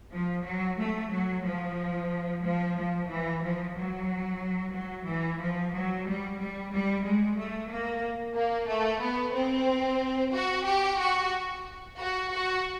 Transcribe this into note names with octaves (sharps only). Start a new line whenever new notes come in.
F3
F#3
A3
F#3
F3
F3
F3
E3
F3
F#3
F#3
E3
F3
F#3
G3
G3
G3
G#3
A3
A#3
A#3
A3
B3
C4
F#4
G4
F#4
F#4
F#4